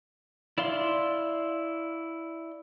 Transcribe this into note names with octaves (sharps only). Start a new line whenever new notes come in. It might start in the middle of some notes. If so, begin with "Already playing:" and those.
E4 D5 F5 C6